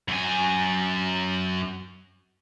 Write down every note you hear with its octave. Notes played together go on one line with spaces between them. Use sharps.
F#2 G#5